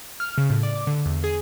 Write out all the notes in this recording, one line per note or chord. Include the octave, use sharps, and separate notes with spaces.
F6
C#3
A2
D5
D6
D3
E2
G#4